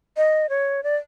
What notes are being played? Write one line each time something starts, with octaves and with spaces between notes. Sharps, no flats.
D#5
C#5
D5